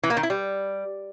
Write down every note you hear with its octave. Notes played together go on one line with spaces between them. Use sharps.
E3
A#3
D#3
E4
G3